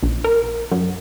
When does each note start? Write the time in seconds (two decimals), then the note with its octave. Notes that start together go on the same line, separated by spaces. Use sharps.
0.03 A#1
0.24 A#4
0.71 F#2